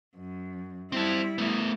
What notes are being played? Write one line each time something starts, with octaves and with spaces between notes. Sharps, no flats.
F#2
G3 C4 E4 A5
A3 B3